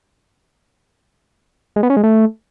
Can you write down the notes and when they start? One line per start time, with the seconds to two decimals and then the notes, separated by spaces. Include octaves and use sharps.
1.76 G#3
1.83 B3
1.90 C#4
1.97 G#3
2.03 A3